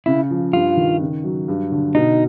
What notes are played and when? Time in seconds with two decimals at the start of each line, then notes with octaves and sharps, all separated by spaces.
0.06 C#3 E4
0.31 F3
0.53 G2 F4
0.77 D#3
1.01 C#3
1.24 F#3
1.48 G2
1.72 D3
1.95 B2 D#4